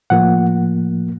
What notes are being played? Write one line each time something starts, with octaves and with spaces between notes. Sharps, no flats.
A2 F3 A#3 F#5